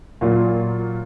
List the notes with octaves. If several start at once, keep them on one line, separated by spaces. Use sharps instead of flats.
A#2 F#3 A#3 F4